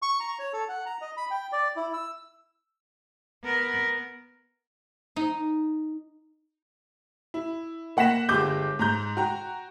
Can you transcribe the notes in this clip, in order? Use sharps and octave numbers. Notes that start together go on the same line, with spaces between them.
C#6
A#5
C#5
A4
F#5
A#5
D#5
B5
G5
D5
E4
E6
B3 A#4
D#4
E4
A#3 F#5 A#6 B6 E7
G1 G#3 G4 D6 G6
G#2 A#5 G6
F#4 G5 A#5